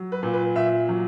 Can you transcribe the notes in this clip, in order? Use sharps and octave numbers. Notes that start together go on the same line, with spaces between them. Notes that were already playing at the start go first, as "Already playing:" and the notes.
Already playing: F#3
B4
A#2
B4
A#2 E5
F#3